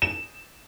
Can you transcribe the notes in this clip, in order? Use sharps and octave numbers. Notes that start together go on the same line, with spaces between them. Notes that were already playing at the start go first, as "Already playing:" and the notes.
E7